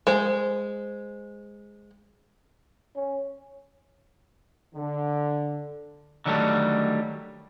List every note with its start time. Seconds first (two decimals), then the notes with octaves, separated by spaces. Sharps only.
0.07 G#3 C5
2.95 C#4
4.74 D3
6.26 D3 D#3 F#3 G3 A3